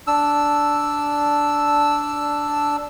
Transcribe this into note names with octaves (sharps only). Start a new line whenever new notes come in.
D4 E6